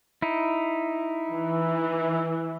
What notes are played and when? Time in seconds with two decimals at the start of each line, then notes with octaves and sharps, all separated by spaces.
0.22 D#4 E4
1.31 E3